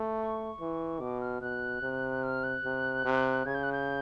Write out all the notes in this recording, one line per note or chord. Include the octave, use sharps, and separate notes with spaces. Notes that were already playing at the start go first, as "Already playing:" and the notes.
Already playing: A3
C#6
E3
B2 D6
F6
B2 F#6
C3
F6
F#6
C3
C3
C#3 G#6
G6
F#6
G6